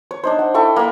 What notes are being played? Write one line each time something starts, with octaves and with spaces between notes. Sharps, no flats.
C#5
D4 D#4 C5
F#5
E4 A4 G5 C#6
A#3 B5